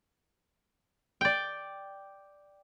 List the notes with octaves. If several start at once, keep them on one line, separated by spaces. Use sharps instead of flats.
D5 G5